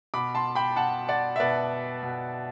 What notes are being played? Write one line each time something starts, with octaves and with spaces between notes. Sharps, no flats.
B2 B5 D6
A5 C6
G5 B5
B2 F#5 A5
D5 F#5
E5
B2 B4 D5
B2